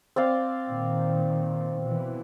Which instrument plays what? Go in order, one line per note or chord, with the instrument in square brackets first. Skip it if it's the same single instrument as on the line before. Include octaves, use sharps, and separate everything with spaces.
[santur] C4 D5 F5
[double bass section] A#2 D#3
B2 E3